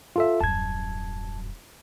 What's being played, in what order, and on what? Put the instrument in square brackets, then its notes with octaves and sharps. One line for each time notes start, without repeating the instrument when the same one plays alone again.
[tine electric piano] F4 A4 E5
[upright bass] D#1 F#2 [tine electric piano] A5 G#6